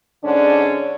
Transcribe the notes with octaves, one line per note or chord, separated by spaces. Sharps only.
G#2 D3 C#4 D4